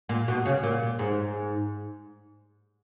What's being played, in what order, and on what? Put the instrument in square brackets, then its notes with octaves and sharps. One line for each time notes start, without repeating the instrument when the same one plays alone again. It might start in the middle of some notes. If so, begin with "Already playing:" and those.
[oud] A#2
B2
C#3
A#2
G#2